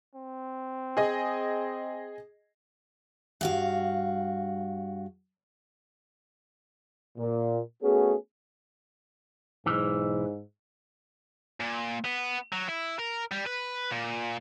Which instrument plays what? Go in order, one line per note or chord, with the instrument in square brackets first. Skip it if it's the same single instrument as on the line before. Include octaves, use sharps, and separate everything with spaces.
[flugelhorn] C4
[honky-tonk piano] G#4 D#5
[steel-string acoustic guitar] G2 F#4 F5
[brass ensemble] A#2
A3 B3 C#4 F#4 G#4
[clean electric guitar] B1 E3 [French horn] G#2
[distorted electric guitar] A#2
B3
F#3
E4
A#4
G3
B4
A#2